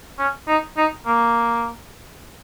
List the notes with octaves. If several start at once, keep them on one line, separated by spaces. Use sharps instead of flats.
C#4
D#4
D#4
A#3